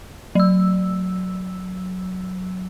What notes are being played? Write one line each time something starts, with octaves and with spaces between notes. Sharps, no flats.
F#3 E6